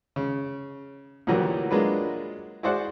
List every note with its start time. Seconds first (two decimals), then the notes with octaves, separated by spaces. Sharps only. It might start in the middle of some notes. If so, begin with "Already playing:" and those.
0.16 C#3
1.27 D2 A#2 E3 F#3 G3 A#4
1.71 F#3 G#3 A#3 D4 F4 B4
2.63 E4 F#4 G#4 C5 D5 F#5